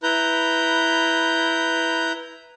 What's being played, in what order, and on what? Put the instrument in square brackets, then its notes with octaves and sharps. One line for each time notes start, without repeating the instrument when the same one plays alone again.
[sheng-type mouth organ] E4 B4 A#5 G6